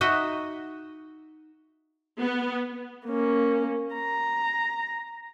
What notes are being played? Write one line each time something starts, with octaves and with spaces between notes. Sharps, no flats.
D#4 F#4 D#5 E5
B3
A#3 C#4
A#5